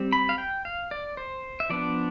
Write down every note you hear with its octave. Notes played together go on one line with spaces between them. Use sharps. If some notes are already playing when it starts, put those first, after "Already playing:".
Already playing: G3 C4
B5
F5
G5
F5
D5
C5
E5
F3 B3 D4 D5